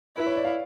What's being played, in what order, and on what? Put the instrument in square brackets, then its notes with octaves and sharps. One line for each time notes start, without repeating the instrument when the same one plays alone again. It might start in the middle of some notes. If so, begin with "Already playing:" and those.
[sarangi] E4 [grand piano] B4
[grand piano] C#5
D5
F5